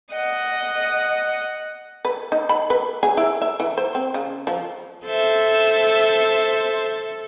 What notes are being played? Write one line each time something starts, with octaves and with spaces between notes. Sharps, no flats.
D#5 F#5
B4
D#4
B5
B4
G#4
E4
E5
E3
C5
C4
C#3
F3
A4 C5 E5